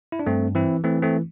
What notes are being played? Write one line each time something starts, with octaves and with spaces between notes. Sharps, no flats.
E4
D4
G2 A3 C4
E3 C4 E4
E3 A3 C4
A3 C4